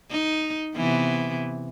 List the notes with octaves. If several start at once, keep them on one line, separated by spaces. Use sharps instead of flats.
D#4
C3 E3 B3